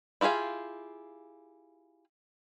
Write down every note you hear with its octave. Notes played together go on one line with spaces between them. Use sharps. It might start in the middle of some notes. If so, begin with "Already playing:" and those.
E4 F4 G4 G#4 F5